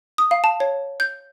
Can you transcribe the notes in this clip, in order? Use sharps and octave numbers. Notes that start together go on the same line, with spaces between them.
D#6
F5
A5
C#5
G6